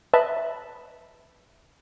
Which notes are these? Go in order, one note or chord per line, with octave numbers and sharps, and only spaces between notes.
B4 D#5 E5 A5 B5